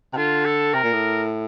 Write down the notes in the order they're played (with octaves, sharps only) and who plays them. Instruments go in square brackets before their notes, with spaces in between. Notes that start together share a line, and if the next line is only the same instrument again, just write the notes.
[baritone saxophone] C3
[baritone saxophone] D3 [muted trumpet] F4
[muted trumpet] A4
[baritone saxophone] C3 [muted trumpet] A#4
[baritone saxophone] A#2
A2